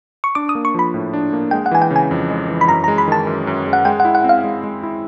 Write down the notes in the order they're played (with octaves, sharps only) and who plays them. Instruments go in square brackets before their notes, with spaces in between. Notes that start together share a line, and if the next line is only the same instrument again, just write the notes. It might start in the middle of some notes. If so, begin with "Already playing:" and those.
[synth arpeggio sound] C#6
[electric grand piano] D4 [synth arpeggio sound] D6
[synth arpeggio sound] D#6
[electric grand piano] A#3
[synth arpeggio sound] C#6
[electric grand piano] F3 [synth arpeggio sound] B5
[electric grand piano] A2
D4
A#3
[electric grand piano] G#3 [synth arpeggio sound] G5
[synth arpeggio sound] F#5
[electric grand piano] E3 [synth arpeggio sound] G#5
[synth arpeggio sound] G5
[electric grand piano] C#3
[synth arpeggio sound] G#5
[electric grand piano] F2
G#3
E3
[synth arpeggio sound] B5
[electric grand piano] F#2 [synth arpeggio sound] A#5
[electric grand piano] G#3 [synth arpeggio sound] A#5
[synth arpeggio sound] B5
[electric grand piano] D#3 [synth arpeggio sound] A5
[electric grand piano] F#2
F#2
G#3
[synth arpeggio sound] F#5
[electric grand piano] G#3 [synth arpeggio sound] G5
[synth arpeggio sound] F#5
[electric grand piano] E4
[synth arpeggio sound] F#5
[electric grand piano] C4
[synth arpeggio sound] F5
[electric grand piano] G#3
G#3
E4